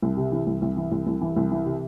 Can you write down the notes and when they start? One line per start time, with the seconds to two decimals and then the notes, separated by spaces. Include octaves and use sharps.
0.02 C2
0.17 C3
0.32 E3
0.47 C2
0.62 C2
0.77 E3
0.92 C2
1.07 C2
1.21 E3
1.36 C2
1.51 E3
1.66 C3